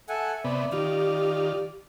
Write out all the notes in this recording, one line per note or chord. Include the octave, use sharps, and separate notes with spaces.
A4 E5 F#5 G#5
C3 B3 D5
D#3 F4 G4